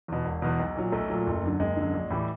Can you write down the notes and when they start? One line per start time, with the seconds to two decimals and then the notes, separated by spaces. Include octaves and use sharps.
0.08 E2 B2
0.25 E1
0.42 E2 B2
0.59 B1
0.76 A#2 F#3
0.92 B1 A3
1.10 A#2 F#3
1.27 F#1
1.43 F#2 D3
1.59 F#1 G#3
1.77 F#2 D3
1.94 A#1
2.11 A2 E3 G3